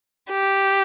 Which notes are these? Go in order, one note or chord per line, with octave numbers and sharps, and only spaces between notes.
G4